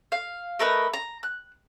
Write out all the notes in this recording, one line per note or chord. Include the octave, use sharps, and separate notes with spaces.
F5
A3 A#4 B4 D#5
A#5
F#6